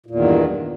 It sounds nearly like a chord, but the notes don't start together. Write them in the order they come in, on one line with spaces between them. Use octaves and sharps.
A#2 E2 D#3 G2